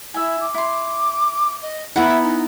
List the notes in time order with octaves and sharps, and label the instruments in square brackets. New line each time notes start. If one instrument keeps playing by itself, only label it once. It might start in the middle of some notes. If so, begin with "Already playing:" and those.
[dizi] E4 [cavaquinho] E5 G#5
[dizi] D6
[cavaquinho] E4 C6
[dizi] D#5
[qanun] B3 E4 [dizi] E5 [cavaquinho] F#5 G#5 A#5
[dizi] D#4